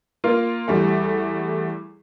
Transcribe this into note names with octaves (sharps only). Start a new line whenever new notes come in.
A#3 F4 A#4
E2 G3 A3